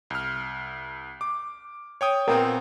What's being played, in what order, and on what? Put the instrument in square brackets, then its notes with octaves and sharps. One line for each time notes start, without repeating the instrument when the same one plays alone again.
[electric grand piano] C2 F6
D6
C#5 G5 D#6
[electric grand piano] A#2 B3 C4 [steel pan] A#4 G5